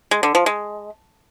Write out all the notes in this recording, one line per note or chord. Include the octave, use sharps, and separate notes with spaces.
G#3
D3
F3
G#3